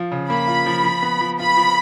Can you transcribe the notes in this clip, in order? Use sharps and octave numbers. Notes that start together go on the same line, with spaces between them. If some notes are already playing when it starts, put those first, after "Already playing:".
Already playing: F3 F4
C#3
A#3 B5
F4
F3
F3
B3
F3
F4 B5
F3